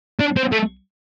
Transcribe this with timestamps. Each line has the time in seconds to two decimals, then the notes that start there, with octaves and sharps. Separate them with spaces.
0.19 D4
0.37 C4
0.52 A3